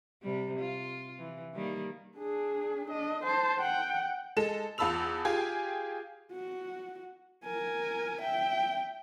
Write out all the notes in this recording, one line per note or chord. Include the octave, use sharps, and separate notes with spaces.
C3 G3
F4
E3
D#3 G3 A#3
D4 G#4
D4 D#5
C5 A5
F#5 G5
G#3 A4 E7
E2 F4 A5 B5 E6 F7
F4 G4 G#4 G#5
F#4
A#4 G#5
E5 G5